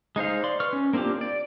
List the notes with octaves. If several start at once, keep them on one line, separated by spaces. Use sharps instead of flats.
G#3 D#4 C5 F5
D5 C6
B4 C#6 F6
C#4
A#3 C4 D4 F4 G4
D5